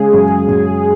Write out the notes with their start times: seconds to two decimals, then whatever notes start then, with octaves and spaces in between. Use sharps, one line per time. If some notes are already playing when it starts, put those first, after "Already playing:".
Already playing: C#3 G#3 G#4
0.13 F#2
0.48 F#2